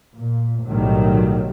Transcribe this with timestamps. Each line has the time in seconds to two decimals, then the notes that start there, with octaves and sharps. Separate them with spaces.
0.14 A#2
0.66 B1 A2 D#3 F#3 G3